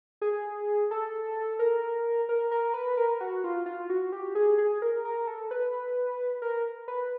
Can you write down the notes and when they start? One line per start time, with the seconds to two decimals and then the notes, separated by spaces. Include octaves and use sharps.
0.21 G#4
0.91 A4
1.59 A#4
2.29 A#4
2.51 A#4
2.74 B4
2.97 A#4
3.21 F#4
3.44 F4
3.66 F4
3.90 F#4
4.12 G4
4.35 G#4
4.58 G#4
4.82 A#4
5.05 A#4
5.27 A4
5.51 B4
6.42 A#4
6.88 B4